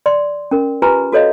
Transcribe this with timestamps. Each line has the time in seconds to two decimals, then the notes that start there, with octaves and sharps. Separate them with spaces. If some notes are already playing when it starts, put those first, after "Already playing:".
0.06 D5 C6
0.51 C#4 A#4
0.82 F4 G4 B4 G#5 A#5
1.12 F#4 A4 C#5 D#5 F5